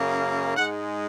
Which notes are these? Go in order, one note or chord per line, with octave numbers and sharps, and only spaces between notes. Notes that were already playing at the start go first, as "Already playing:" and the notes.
Already playing: F#2 C#3 A#3
G#2 G#3 F#5